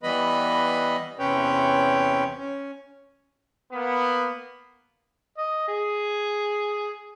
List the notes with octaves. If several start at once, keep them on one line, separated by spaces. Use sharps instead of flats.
E3 G3 B3 B4 D#5 B5
E2 C3 C#4 B4 C#5 G5
C#4
A#3 B3
D#5
G#4